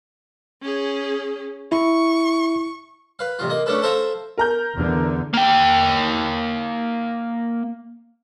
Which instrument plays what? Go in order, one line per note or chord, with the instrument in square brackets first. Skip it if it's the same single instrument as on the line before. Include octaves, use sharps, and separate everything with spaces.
[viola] C#4 G#4
[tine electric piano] E4 [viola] C#6
[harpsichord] B4 F5
A1 C3 F4
A#3 D#5
A3 C#4 D4 A4 B4
A4 C5 E5 F5 A#5
[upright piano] A#4 A#5 G6
[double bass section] E2 D3
[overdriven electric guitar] A#3 G5